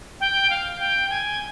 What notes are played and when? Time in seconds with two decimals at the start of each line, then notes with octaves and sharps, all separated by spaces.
0.20 G5
0.50 F5
0.80 G5
1.10 G#5